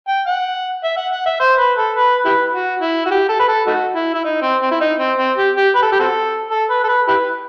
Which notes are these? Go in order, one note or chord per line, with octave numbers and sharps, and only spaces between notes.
G5
F#5
E5
F#5
F#5
E5
C5
B4
A4
B4
E4 G4 B4
F#4
E4
F#4
G4
A4
B4
A4
A3 D#4 F#4
E4
E4
D#4
C4
C4
E4
D#4
C4
C4
G4
G4
B4
A4
G4
C4 F#4 A4
A4
B4
A4
B4
E4 G4 B4